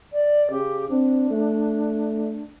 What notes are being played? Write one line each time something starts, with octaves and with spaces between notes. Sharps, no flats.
D5
C#3 G4
C4 D4
A3